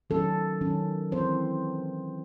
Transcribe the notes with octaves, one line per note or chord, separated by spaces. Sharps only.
D#3 F#3 C#4 A4
D#3 F#3 C#4
E3 C4 C5